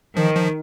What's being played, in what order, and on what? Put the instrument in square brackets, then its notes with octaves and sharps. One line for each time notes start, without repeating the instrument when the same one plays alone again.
[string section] D#3 [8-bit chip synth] F3
[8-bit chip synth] F3